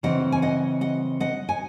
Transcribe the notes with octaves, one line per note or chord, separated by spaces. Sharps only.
C#3 E3 C4 D#5 F#5
G#5
D#5 F#5
D#5 F#5
D#5 F#5
G#5